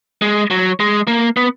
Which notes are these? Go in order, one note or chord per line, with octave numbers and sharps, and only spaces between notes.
G#3
F#3
G#3
A#3
B3